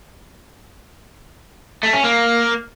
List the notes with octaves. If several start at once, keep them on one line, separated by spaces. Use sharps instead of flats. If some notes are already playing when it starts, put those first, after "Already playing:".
A3
C#4
A#3